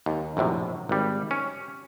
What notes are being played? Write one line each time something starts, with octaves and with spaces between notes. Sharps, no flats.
D#2
A#1 F#2 A2 C3
G#1 G3
C#4